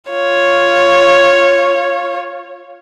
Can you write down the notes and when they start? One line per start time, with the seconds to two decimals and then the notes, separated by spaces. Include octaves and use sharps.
0.11 F4 C#5